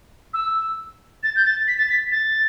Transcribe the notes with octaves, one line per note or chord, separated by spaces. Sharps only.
E6
A6
G6
A6
B6
A6
B6
A6